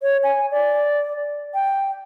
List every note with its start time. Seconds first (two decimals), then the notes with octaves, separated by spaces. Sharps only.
0.02 C#5
0.24 G#5
0.51 D5
1.54 G5